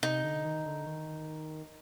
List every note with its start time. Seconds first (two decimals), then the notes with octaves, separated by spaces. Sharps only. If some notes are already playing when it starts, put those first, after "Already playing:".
0.03 C3 D#4
0.24 D3
0.45 D#3
0.66 D3
0.87 D#3